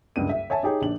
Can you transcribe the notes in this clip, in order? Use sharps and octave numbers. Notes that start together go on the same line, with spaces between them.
F#1 C#2 G2 D#7
E5
C#5 E5 G#5 A5
D#4 G4 G#4 C#5
A#1 D4 F#7